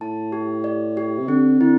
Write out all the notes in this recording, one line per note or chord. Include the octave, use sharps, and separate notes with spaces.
A2 A5
G4
D5
G4
C3
D3 C4
D3 E4